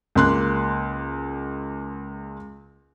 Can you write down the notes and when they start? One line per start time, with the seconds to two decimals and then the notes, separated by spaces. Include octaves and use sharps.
0.15 C#2 A#3 C6 F#6